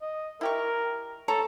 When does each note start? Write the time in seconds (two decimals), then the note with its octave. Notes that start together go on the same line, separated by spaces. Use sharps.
0.01 D#5
0.41 E4 G4 A#4 C#6
1.28 A4 C#5 A5 A#5